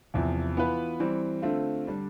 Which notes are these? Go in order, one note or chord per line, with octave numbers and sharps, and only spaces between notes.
E2 C3 F3
E3 B3 F4 B4
E3 G3 C4
D3 A3 C4 F4
D3 G3 D4